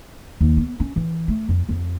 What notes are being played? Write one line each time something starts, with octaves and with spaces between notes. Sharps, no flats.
D#2
B3
C#4
E3
A3
F2
F2